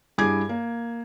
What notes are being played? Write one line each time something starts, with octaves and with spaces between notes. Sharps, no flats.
G2 E4 G#4 G#5 D6 G#6
A#3